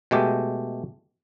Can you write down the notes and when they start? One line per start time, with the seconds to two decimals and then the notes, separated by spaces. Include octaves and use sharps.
0.11 B2 G#3 A3 G4